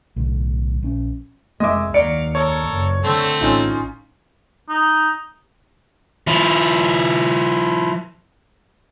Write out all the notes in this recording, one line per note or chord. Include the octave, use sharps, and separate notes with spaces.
B1 A2 D3
A#1 C#4
F1 G#3 D#5 E5 D6
D#2 F#3 D5 F5 C#7 D7
A4 A#4 C#5
F#1
D3 A3 C4 A4
A1 C#4 D#4 F4
D#4
F3 E4